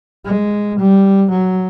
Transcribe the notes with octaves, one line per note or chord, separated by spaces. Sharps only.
G#3
G3
F#3